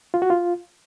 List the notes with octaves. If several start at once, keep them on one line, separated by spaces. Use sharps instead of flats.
F4
F#4
F4